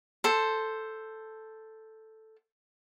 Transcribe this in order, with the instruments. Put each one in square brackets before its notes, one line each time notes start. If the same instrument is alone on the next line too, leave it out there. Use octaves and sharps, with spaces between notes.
[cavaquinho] A4 C5